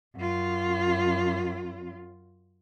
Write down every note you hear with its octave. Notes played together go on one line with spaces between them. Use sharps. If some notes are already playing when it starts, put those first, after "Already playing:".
F#2 F4